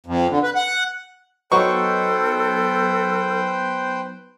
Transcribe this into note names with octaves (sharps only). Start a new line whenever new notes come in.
F2
D3
B4
F#5
F#3 B3 D#4 A4 B4 C5 G5 C#6